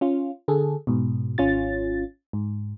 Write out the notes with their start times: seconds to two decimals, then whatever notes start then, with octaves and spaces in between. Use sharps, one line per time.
0.01 C#4 F4
0.48 D3 G#4 A4
0.87 G#2 B2
1.38 G#1 C#4 F4 A6
2.33 G#2